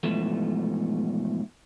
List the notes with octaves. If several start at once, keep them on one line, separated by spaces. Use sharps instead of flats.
G#2 B2 E3 F3 A3